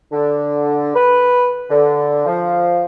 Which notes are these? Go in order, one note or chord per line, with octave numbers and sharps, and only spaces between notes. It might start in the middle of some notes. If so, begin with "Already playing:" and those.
D3
B4
D3
F3